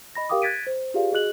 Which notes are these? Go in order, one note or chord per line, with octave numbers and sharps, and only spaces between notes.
D#5 B5 A#6
G4 A#4 F5 G5 D6 D#6
F#6 G#6 A6 B6 D7 D#7
C5
F4 G4 G#4 B4 D5 F5
F#4 G#4 D#5 F#6 F#7